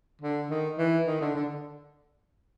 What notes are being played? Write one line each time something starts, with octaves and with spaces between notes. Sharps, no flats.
D3
D#3
E3
D#3
D3
D3